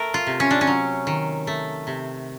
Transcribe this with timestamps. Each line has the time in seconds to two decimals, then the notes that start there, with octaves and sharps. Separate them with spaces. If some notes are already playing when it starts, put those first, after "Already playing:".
Already playing: A3 A#4
0.14 F4
0.27 C3
0.40 C#4
0.51 D4
0.61 C#4
0.67 F#3
1.07 D#3
1.47 A3
1.87 C3